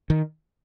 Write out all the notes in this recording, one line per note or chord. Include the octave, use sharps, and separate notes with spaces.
D#3